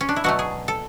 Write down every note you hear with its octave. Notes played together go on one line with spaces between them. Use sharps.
C#4
D4
E4
B2 F#3 A3 F#4
G#4
A4